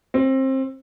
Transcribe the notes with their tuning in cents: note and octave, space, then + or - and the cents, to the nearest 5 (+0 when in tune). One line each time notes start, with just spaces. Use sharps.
C4 +25